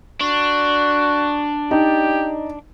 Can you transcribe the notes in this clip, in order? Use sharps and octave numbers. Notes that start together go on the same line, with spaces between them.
D4 F#4
D#4 G4